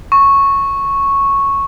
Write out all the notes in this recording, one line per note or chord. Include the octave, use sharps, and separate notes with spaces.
C#6